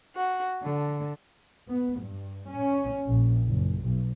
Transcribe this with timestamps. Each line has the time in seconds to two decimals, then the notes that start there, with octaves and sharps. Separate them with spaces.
0.16 F#4
0.61 D3
1.69 B3
2.00 G2
2.48 C#4
3.06 A#1
3.45 F#1
3.82 B1